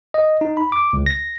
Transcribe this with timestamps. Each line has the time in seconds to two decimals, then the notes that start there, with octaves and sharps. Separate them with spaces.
0.14 D#5
0.41 D#4
0.57 B5
0.72 D6
0.93 C#2
1.06 A#6